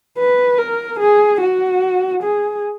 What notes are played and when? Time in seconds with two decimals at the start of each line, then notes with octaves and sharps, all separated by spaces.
0.18 B4
0.58 A#4
0.99 G#4
1.40 F#4
2.23 G#4